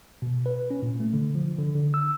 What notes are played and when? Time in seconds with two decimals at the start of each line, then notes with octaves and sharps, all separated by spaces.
0.22 B2
0.46 B4
0.70 C#4
0.82 A#2
1.00 A3
1.13 D3
1.35 F3
1.58 D3
1.75 D3
1.94 E6